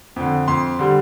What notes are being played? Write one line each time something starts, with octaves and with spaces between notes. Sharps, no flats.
F2 D3
F2 C6
D3 G3